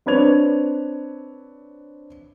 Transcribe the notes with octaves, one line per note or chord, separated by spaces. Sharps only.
C4 D4 B4 C#5 G#6 F7